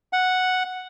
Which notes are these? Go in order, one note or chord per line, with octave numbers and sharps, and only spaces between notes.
F#5